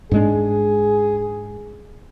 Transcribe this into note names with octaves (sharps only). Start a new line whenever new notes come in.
G#2 G#3 D4 G#4